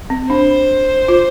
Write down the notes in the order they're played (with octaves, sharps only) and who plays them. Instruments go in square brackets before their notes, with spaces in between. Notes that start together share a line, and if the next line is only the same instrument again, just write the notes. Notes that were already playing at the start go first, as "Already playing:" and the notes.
[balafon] C4
[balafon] D4 [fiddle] C5
[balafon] F4